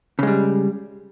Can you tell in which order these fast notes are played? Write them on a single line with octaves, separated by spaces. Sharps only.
C#3 G#3 G3